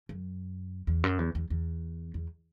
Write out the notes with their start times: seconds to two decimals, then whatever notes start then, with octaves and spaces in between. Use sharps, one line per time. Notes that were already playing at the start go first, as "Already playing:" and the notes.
0.09 F#2
0.87 E2
1.04 F#2
1.19 E2
1.35 E2
1.50 E2
2.14 E2